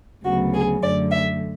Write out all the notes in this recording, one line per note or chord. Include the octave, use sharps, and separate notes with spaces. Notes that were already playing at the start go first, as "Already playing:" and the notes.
D2 C#3 F#3 B3 F#4
G#4
F#2 D3 A3 D5
E5